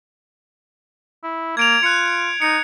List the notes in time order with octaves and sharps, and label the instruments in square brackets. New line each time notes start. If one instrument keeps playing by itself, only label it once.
[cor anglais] E4
[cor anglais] A#3 [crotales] G#6 D7 F7
[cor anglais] F4 [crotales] F#6 C#7
[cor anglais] D#4 [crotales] C#7